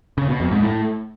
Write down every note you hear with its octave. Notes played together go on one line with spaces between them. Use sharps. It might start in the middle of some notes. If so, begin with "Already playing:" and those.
C#3
B2
F2
G#2
A2